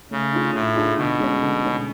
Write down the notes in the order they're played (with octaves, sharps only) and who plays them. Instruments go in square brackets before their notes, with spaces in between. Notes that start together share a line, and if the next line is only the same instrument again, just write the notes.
[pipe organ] C#3 [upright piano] A3
[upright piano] D4 F4 G#4
[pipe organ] A2 [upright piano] A3
[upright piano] D4 F4 G#4
[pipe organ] B2 [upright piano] D3
[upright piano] G#3 C#4
D3
G#3 C#4